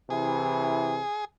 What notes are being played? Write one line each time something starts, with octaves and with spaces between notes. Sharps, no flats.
C3 E3 E4 G#4